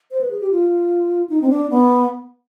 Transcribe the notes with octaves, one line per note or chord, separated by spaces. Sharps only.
C5
B4
G#4
G4
F4
D#4
C4
D4
B3